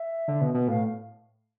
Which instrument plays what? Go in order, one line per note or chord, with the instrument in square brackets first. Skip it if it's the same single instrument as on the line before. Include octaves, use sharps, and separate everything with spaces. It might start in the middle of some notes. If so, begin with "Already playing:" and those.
Already playing: [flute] E5
[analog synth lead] D3
B2
B2
[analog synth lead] A2 [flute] F5